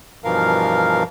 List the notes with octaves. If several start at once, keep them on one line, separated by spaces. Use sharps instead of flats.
G2 B2 E3 F3 A#4 F5